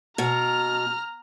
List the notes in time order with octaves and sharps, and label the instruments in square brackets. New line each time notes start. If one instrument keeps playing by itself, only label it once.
[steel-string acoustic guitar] B2 [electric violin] A#5 F6